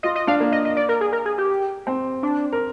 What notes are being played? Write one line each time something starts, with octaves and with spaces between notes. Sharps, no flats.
F4 D#5
D#5
D4 F5
A#3
D#5
D#5
D5
A#4
G#4
A#4
G#4
G4
C4
D4
A#4